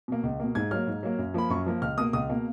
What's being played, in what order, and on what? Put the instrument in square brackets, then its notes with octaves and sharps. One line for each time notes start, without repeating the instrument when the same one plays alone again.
[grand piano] B2 A#3
C#2
B2 A#3
G#2 G#6
F#3 A#3 F6
G#2
F#3 A#3
F#2
F3 A#3 B5
F#2 C#6
F3 A#3
C#2 F6
B2 A#3 D#6
C#2 D#6
B2 A#3